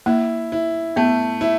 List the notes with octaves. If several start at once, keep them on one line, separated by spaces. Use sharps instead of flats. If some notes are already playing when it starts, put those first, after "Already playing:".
A#3 E4
E4
A3 B3
E4